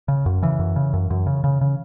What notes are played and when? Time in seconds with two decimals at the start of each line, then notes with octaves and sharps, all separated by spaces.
0.08 C#3
0.26 F#2
0.42 C#3 E3
0.59 F#2
0.76 C#3
0.93 F#2
1.10 F#2
1.27 C#3
1.44 C#3
1.61 C#3